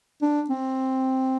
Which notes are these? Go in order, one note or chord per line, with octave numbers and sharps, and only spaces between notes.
D4
C4